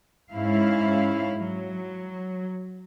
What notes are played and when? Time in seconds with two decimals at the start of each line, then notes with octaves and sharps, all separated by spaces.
0.32 G#2 C#4 E4 F5
1.36 F#3